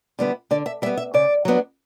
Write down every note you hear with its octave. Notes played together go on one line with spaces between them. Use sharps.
D3 G3 B3 E4
D3 D5
E5
G3 B3 E5
E5
C#3 D5
F#3 B3 D4